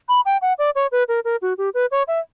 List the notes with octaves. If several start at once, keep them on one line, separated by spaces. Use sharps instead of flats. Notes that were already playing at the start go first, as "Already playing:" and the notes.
B5
G5
F#5
D5
C#5
B4
A#4
A#4
F#4
G4
B4
C#5
E5